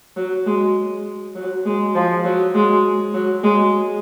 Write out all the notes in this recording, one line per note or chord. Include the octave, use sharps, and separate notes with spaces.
F#3
G#3
F#3
G#3
F3
F#3
G#3
F#3
G#3